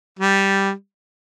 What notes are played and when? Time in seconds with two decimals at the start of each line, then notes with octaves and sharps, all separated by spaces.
0.19 G3